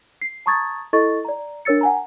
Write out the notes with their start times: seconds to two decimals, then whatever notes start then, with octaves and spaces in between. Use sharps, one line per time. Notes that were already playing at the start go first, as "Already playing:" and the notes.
0.22 C7
0.46 A5 A#5 C#6 D#6 G#6 A6
0.93 E4 A4 D#5 C#6 A6
1.25 D5 A#5
1.65 D4 A#4 C#5 E6 A6 C#7
1.81 F#5 G#5 A#5